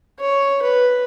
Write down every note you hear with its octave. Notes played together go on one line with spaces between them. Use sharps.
C#5
B4